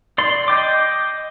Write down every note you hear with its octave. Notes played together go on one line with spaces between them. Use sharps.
D5 C6
D#5 G5 D6